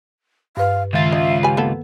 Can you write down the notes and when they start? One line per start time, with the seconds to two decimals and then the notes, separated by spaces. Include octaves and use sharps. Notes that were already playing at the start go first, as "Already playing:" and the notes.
0.57 G2 B4 F5
0.93 C#2 D#3 F4 E5 A6
1.12 D#5
1.43 G4 B4 G#5
1.57 A#3 B3 A4